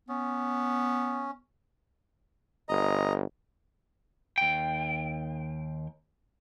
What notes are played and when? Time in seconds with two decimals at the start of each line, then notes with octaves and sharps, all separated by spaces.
0.09 B3 C#4
2.69 G1 D#5 A#5
4.38 D#2 G5